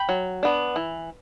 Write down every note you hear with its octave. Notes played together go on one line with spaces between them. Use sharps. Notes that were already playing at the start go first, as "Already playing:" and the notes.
Already playing: G5 B5
F#3
B3 D4
E3